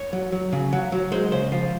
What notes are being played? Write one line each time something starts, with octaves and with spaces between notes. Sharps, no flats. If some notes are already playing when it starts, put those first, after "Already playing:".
Already playing: C#5
F#3
F#3
C#3
F#3
F#3
G#3 C5
C#3 C5
F3 F5